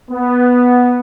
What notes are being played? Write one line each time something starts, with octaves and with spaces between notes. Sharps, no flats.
B3